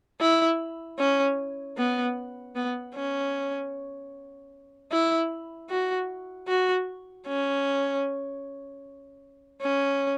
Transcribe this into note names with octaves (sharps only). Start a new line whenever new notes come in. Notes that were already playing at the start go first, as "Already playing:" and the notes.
E4
C#4
B3
B3
C#4
E4
F#4
F#4
C#4
C#4